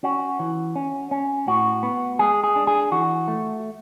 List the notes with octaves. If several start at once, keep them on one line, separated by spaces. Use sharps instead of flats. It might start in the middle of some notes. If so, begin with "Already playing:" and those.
C#4 F#4
E3
C#4
C#4
A2 F#4
B3
G#3 G#4
G#4
D4
G#4
E3 F#4
A3